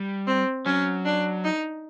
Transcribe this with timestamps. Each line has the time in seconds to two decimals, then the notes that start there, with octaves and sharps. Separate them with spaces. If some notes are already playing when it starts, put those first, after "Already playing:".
Already playing: G3
0.27 C4
0.66 F#3 C#4
1.05 D4
1.44 D#4